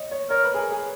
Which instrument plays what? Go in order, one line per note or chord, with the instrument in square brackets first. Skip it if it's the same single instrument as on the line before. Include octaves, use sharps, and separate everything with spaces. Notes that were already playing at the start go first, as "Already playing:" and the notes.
Already playing: [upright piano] C#5 D#5
C#5
[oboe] A#4 [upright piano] C#5
[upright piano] B4
G#4
A#4
G#4